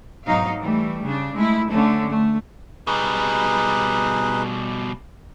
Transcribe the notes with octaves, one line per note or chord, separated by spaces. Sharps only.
G#2 B2 F#3 D#4 F5
E3 G3 A3
C#3 D4
G#3 A3 E4
D3 A3 C#4
A3
B2 G3 D#4 G#4 B4